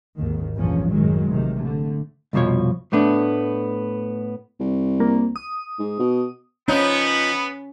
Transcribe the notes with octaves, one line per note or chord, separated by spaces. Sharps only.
G#1 D#2 G#2 D#3
A#1 E2 G2 A#2 F3 C#4
F#2 A2 D#3 F#3 G#3
A1 A2 C3 D#3
D3 A3
C2 F2 B2 F3 C#5
A2 A3 B3 D4
C2
A#3
D#6
G#2
B2
F3 B3 C#4 D#4